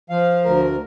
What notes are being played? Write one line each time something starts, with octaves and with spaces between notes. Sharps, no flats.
F3 F5
D2 A#4